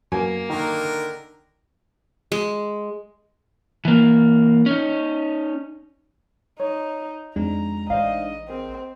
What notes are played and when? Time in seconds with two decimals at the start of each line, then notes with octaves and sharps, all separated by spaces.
0.12 F#2 A#3 B3 G#5
0.50 D3 D#3 A#4
2.32 G#3
3.85 E3 A#3
4.66 C#4 D#4
6.60 D#4 C#5
7.36 F2 G#3 D4 D#4 A#5
7.90 A1 C5 D5 D#5 F5
8.49 C4 G#4 A#4